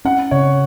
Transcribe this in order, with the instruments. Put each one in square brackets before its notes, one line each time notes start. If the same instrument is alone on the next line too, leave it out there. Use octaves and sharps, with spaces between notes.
[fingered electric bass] C#4 [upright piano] F#5
[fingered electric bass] C#3 [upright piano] C#5